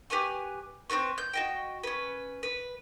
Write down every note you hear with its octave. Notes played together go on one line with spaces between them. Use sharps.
G4 B4 G#5 C#6
C4 F#4 B4 C#6
G6
F#4 D#5 G5
C#4 B4
B4